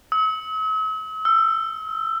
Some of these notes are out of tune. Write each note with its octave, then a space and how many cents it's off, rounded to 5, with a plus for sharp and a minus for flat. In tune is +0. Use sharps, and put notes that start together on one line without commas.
E6 -45
E6 +20